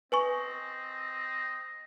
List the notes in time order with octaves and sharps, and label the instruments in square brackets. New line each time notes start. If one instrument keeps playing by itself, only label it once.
[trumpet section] C4 D#5 [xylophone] B4 G#5 C#6